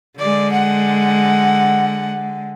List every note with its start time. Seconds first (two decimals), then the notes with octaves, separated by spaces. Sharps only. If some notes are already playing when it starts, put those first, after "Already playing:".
0.19 D3 G#3 D5
0.52 F#5